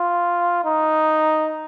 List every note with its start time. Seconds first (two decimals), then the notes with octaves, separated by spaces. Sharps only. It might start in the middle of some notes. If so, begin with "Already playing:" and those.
Already playing: F4
0.65 D#4